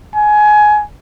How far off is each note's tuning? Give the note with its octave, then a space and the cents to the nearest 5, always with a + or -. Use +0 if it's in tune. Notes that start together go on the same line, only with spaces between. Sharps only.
G#5 +20